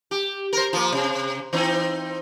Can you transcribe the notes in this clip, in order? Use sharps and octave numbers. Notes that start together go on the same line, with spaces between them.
G4
A#4 C5
F3 A#3
C3
E3 C4 D#4